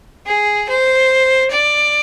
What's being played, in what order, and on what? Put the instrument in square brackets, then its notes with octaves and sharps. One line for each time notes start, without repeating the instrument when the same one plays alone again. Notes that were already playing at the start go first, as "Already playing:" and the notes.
[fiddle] G#4
C5
D5